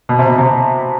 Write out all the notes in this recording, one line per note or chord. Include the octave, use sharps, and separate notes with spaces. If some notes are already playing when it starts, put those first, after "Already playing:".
B2
C3
B2
C3